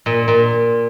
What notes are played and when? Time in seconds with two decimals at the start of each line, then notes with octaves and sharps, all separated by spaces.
0.06 A#2
0.28 A#2